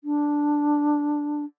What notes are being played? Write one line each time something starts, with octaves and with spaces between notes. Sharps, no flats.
D4